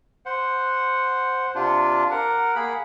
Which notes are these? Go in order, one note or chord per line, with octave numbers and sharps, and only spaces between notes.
C5 F#5
C3 D4 F4
A#4 F#5
A#3 G#4 B5